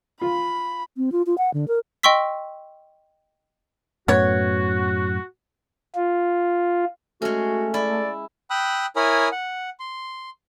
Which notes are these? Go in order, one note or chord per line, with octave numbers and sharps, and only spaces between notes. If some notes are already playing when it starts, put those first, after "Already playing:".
F4 B5
C4
F4
F4
F#5
D3
A#4
D#5 G5 C6 C#6 E6 B6
F#2 A2 B3 F#4 C#5
F4
G#3 A3 C#4 F#4
E4 D5
G5 B5 D#6 E6 F#6
E4 A#4 C#5 G#5 B5 D#6
F#5
C6